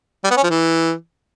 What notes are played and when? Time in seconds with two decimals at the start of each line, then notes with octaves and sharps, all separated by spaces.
0.24 G3
0.31 B3
0.37 C#4
0.44 F3
0.50 E3